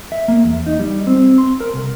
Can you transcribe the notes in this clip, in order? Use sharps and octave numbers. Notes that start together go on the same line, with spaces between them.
E5
A#3
E2
D#4
G3
C4
C6
A#4
C2